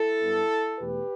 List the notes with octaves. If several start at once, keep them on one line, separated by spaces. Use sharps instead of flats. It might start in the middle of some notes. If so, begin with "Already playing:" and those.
Already playing: E4 A4
G2 G3 B3
E2 B2 A3 G4 B4